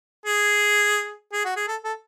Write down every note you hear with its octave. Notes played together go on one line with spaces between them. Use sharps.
G#4
G#4
F#4
G#4
A4
A4